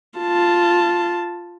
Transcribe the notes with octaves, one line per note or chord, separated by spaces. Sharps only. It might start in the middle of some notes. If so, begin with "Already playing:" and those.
F4 A5